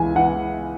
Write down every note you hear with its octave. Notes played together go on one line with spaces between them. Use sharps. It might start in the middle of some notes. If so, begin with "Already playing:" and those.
Already playing: C#2 E3 G#5
E3 F#5